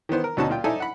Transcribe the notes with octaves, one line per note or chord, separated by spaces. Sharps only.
D#3 E3 B3 C5
A#4
D2 B2 C#4 D#4 F#4 A5
A#2 F4 G5
D#4 A4 C5 D5 E5 G#5
F#5 B5